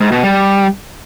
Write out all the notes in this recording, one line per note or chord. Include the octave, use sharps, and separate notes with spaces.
G#2
B2
G3